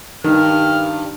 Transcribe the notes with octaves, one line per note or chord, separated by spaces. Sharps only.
G2 D#3 F6